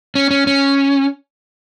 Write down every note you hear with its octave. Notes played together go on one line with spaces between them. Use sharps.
C#4
C#4
C#4